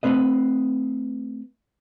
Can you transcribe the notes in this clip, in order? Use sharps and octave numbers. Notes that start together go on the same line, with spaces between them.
A3 C4 B4 D#5